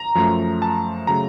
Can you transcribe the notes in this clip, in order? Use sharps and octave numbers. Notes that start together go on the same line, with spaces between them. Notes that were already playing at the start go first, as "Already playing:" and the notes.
Already playing: A#5
F#2 F3 A3
A5
C#3 F#3 A3 A#5